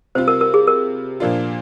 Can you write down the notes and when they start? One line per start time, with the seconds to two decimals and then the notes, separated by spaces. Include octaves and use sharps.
0.15 C3 G3 C4 F4 C5
0.28 A#4
0.41 A#4
0.54 G#4
0.67 A#4
1.20 A#2 F3 A#3 D4 F4